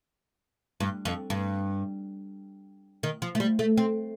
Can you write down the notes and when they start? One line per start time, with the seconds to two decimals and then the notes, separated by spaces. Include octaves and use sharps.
0.80 G2
1.05 F2
1.30 G2
3.03 D#3
3.22 F3
3.35 A3
3.40 G3
3.59 A3
3.77 C4